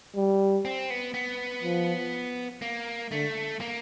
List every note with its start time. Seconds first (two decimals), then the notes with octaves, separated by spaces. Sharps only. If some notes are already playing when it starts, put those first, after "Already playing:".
0.15 G3
0.65 C4
0.90 B3
1.14 B3
1.63 F3
2.62 A#3
3.11 D3 A3
3.60 A#3